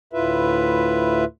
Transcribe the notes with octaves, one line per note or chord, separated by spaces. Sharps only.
D2 A2 E4 F4 B4 E5